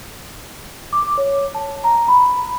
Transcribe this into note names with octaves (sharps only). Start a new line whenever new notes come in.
D6
C#5
A5
A#5
B5